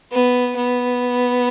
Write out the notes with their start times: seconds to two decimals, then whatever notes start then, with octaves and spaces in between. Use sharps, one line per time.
0.12 B3
0.56 B3